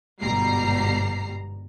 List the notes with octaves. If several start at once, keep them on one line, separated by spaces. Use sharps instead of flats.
G1 G#2 B2 G3 A#5 C7